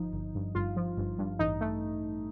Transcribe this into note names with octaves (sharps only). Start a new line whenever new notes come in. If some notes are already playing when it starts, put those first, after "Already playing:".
Already playing: G1 F3 D#4
G1
G2
G1 F4
F3
G1
G2
A1 D#4
A3